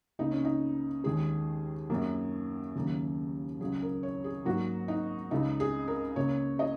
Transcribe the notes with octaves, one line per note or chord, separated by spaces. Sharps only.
C#2 C#3 A#3 D#4
C#4
D#4
D#2 D#3 G#3 G#4
F#2 F#3 A#3
D#2 C#3 F#3 A#3
C#2 C#3 F#3 G#4
A#4
C#5
G#4
G#2 F#3 A#3 F#4
D#4
C#2 C#3 G#3 D#4
G#4
A#4
C#2 C#3 A#3 C#5
D#5